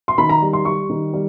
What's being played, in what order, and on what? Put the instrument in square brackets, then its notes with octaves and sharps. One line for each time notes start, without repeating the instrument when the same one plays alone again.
[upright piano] C6
D#3 B5
A#5
G3
C6
G3 C#6
D#3
G3